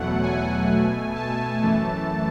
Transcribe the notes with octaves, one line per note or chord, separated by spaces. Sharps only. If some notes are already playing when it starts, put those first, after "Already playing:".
Already playing: E2 B2 F#3 A3 F#5
G#5
B2 A3
A5
F#2 E3 A3